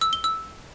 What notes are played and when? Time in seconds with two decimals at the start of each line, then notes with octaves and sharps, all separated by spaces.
0.01 E6
0.13 G7
0.24 E6